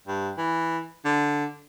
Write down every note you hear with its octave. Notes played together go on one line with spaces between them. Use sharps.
G2
E3
D3